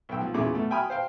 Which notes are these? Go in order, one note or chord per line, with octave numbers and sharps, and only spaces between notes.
B1 B3 G5 E6
F3
E2 A#2 C#3 E4 D6
B2 A3
E5 G5 G#5 B5 D#6 F6
C5 F5 G5